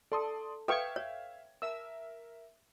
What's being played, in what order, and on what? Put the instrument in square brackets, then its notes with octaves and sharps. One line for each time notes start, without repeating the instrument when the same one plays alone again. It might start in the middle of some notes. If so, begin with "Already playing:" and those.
[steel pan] A4 [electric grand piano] D5 C6 D#6
[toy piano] A4 B4 [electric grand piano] E5 F5 G#6 [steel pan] G5 C#6
[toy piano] C#5
[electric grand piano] A#4 E5 [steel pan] E6